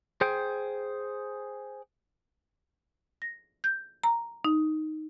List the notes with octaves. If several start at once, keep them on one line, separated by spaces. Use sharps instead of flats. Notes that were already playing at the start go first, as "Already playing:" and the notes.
G#4 C5 G5
A#6
G6
A#5
D#4